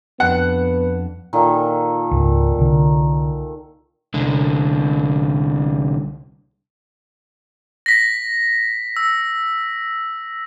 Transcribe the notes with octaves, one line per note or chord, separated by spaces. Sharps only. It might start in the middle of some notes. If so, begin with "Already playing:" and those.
F2 B3 D4 F#5 F#6
A#2 D#3 A4
C#2 G#2
C2 D3
C2 D3
A#6 B6
E6